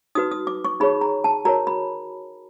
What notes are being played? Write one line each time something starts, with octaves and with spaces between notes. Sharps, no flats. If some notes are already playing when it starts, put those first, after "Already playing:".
D#4 F#4 B4 D#6
D#6
D6
C#6
D#4 G#4 C#5 B5
A#5
A5
F#4 A#4 C#5 A#5
B5